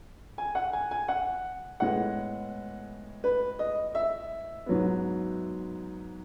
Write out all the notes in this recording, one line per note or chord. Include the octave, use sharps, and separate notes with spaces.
G#5
F#5
G#5
G#5
F#5
A2 G#3 B3 F#5
B4
D#5
E5
G#2 F#3 B3